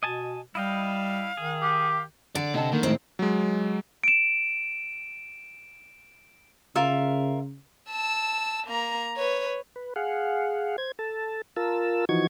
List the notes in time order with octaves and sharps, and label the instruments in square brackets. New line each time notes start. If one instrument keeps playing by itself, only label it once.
[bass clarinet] B2 [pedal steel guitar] D#5 G#5 A5
[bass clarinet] G3 [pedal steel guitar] E4 D#5 G5 [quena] F5
[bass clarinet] D#3 [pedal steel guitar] G#4
[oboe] G4
[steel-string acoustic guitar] D3 [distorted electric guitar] D5
[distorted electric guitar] C3 [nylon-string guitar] C4 D#5 A5
[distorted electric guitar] D#3 [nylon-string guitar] A#3
[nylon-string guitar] F2 A2 G#3 [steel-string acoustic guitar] C4
[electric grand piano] F#3 G#3
[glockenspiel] D7 E7
[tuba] C#3 [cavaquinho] F4 A#4 E5
[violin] A5 E6
A#3 A#5
B4 C#5
[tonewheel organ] B4
G#4 F5 F#5
C5 G#6
A4 A5
F4 A#4 A5 E6
E3 F3 D#4 F#4 C#6 G#6